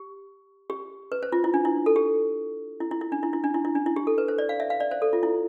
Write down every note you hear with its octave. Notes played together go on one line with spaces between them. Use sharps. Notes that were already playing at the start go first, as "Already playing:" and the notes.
Already playing: G4
G4
B4
C5
F4
E4
D4
E4
A4
G4
E4
E4
E4
D4
E4
E4
D4
E4
E4
D4
E4
G4
A4
B4
C5
D5
F5
E5
F5
D5
C5
A4
F4
E4